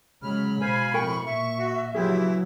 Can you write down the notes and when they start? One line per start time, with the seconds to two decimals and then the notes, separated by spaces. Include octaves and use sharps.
0.23 C#3 F#3 G#3 B5 F6
0.61 B2 C5 F5 G#5
0.94 F2 A2 A#4 G5 G#5 C#6
1.26 A#2 E5 C#6
1.59 F#4
1.94 C#3 E3 F#3 E4 F4 G4 G#4